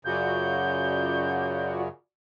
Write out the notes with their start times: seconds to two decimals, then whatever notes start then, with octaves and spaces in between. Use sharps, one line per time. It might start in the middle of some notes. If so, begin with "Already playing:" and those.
0.05 F#2 C#3 F4 F#4 D5 G6